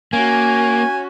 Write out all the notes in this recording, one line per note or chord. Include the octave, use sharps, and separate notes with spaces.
A#3 C#4 F#4 G#5